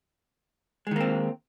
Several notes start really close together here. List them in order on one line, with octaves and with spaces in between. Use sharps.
G#3 D#3 A#3 C4